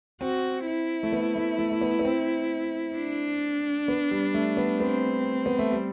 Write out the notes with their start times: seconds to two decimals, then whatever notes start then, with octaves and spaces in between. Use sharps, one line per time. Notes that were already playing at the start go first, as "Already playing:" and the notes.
0.21 C4 F#4
0.67 E4
1.03 A3
1.13 B3
1.36 A3
1.59 A3
1.71 A3
1.81 B3
1.99 B3
2.05 C4
2.96 D4
3.88 B3
4.11 G3
4.34 A3
4.57 B3
4.80 B3 C4
5.46 B3
5.59 A3
5.72 G3